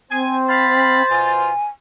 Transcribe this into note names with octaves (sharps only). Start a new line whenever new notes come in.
C4 C5 G#5
F5 B5 A6
B2 F4 G#5